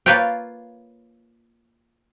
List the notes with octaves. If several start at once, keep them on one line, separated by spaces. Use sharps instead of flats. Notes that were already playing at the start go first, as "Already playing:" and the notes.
A#3 F4 B4 C#5 D5 G5